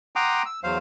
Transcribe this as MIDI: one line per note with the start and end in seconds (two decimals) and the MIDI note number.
0.16 0.43 78
0.16 0.43 79
0.16 0.43 82
0.16 0.43 84
0.16 0.43 86
0.16 0.43 87
0.46 0.60 88
0.64 0.78 40
0.64 0.78 54
0.64 0.78 72
0.64 0.78 77